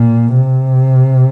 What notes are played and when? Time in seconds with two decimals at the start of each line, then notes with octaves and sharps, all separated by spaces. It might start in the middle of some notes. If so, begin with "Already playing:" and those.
Already playing: A#2
0.35 C3